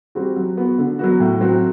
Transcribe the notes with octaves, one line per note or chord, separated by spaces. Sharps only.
G3 C4 F#4
F#3
B3 F#4
D3
F#3 B3 F#4
A2
F#3 C4 F#4